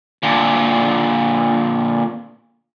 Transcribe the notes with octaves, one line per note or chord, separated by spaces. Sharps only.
A#2 D3